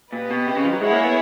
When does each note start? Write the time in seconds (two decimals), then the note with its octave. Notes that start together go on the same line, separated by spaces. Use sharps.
0.12 A#2 G4 B4 D#5
0.31 B2
0.48 C3
0.56 C#3
0.64 F3
0.73 F#3
0.81 G#3 E4 G#4 C#5 F#5
0.93 A#3
1.04 B3